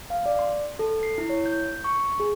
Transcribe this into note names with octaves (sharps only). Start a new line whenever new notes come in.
F5
D5
C6
A4
C7
E4
C#5
G6
C#6
G#4